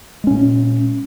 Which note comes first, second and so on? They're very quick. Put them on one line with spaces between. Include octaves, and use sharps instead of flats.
G#3 C#4 A#2